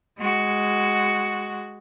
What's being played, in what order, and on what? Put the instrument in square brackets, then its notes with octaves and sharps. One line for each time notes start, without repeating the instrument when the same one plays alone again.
[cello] G#3 F#4